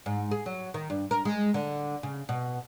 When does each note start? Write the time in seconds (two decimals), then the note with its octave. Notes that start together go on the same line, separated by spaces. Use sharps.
0.06 G#2
0.31 G#4
0.46 F#3
0.74 D#3
0.90 G2
1.11 A#4
1.25 G#3
1.54 D3
2.03 C#3
2.29 B2